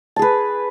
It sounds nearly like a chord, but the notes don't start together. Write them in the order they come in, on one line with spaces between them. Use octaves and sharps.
A5 G#4 B4